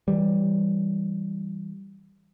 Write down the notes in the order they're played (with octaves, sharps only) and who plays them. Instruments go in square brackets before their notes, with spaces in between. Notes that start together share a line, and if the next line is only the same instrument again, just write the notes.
[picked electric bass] E3 G3